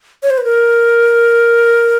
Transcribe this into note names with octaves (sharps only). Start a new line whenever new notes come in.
C#5
C5
B4
A#4